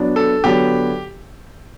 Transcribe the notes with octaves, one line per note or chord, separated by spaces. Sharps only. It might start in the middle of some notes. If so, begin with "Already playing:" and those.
Already playing: F#3 B3 D4
A4
D3 F#3 B3 G4